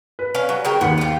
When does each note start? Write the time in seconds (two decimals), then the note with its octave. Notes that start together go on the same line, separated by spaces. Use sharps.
0.19 B4
0.35 C#4 F5
0.49 F#3
0.65 C#3 A#4 G5
0.81 D#2 B3 C#7
0.98 F4 G4